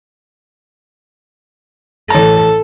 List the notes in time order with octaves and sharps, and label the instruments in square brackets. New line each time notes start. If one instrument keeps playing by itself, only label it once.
[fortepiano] A1 A#5 [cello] A4